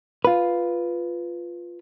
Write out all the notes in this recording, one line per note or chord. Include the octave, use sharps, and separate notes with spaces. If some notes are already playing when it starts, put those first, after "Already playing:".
F4 B4